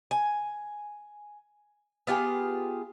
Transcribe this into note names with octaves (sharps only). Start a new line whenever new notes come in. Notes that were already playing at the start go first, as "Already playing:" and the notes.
G#5
B3 F4 G4 G#4